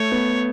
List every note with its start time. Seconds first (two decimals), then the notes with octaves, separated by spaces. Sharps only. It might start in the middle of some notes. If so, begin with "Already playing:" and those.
Already playing: A3 C#5
0.12 B3